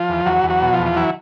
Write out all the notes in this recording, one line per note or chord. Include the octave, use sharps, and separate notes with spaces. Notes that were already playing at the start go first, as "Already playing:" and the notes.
Already playing: F3 F4
E2
E2 F#3 F#4
E2
F#3 F#4
B2
F3 F4
E2
F4
E3 F#3 E4